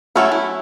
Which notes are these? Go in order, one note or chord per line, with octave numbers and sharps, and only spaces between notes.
F#3 A3 C#4 E4 F#4 A4
E4